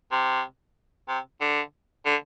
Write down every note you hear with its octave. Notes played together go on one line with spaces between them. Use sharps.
C3
C3
D3
D3